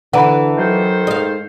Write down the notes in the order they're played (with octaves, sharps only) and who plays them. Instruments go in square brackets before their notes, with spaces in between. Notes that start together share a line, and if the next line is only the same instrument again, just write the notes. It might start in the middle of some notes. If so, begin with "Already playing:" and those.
[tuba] D3 [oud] E3 D4 [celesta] F#5 A#5 B5
[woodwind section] D#3 A4 C5 [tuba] F#3
[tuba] G#2 [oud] D#5 F5